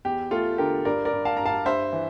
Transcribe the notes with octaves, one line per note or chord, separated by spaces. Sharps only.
E2 G4
A3 F4 A4
D3 G4 A#4
G2 A#4 D5
A#4 D5
G2
F5 A5
G2 A#5
F5 A5
G2 C5 E5
E3